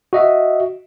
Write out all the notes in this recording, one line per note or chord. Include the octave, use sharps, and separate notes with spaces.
F#4 D#5 E5